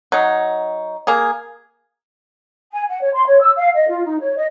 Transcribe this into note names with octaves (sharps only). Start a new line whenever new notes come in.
F#3 D#4
A#3 G#4
G#5
F#5
C#5
C6
C#5
E6
F5
D#5
F4
D#4
C#5
D#5